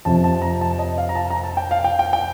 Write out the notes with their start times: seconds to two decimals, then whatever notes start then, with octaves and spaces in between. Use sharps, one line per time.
0.05 F2 C3 F3 A5
0.24 A5
0.42 A#5
0.61 A5
0.79 D#5
0.98 F5
1.09 A#5
1.15 A5
1.30 A#5
1.43 A5
1.57 G5
1.71 F5
1.84 G5
1.99 G5
2.13 G5